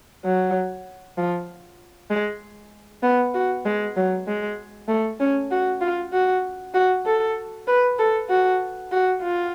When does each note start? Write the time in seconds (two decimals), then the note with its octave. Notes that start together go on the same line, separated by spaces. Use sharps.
0.25 F#3
1.18 F3
2.10 G#3
3.03 B3
3.34 F#4
3.65 G#3
3.97 F#3
4.27 G#3
4.88 A3
5.20 C#4
5.51 F#4
5.81 F4
6.13 F#4
6.74 F#4
7.06 A4
7.67 B4
7.98 A4
8.30 F#4
8.92 F#4
9.22 F4